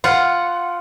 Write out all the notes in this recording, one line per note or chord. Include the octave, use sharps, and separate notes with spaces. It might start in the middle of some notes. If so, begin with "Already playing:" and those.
F4 F#5